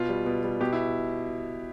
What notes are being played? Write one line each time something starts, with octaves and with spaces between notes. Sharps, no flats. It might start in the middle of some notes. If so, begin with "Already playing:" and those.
Already playing: B2 F4
G3
B2
G3
B2 G4
E4